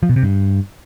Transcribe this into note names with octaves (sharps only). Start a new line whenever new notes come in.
F3
B2
C3
G2